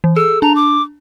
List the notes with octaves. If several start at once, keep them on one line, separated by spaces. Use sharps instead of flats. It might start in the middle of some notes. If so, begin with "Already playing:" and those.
E3
G#4 A4 E6
D4 A5 A#5
D6